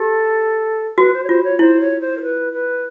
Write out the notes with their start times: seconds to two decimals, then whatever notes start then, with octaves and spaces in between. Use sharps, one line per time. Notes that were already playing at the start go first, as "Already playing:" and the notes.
Already playing: G4 A4
0.97 F#4 B4
1.13 C5
1.24 C#5
1.29 F4 C5
1.44 C#5
1.59 E4 C5
1.80 C#5
2.01 C5
2.17 A#4
2.21 B4
2.53 B4